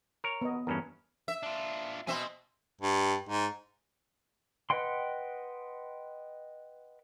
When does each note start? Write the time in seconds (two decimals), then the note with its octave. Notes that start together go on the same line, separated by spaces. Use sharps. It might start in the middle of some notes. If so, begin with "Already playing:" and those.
0.24 A#4 C#5
0.41 B3 D#5
0.67 E2 G2 C#4 A#4 B4
1.28 E5
1.43 D4 F4
2.07 B2 C4 E5 G#5 C6
2.81 G2
3.29 G#2
4.70 B4 D#5 F#5 G5 C6